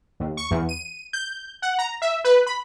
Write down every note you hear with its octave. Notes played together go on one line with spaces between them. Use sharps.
D#2
C#6
E2
D#7
G6
F#5
A#5
E5
B4
B5